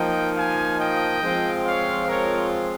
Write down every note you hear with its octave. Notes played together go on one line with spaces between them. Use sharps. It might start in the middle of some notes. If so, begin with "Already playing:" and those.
Already playing: F3 A#3 D#4 D#5 G5
F5 G#5
D#5 G5
F3 G#3 C4 F4
C#5 F5
A#4 C#5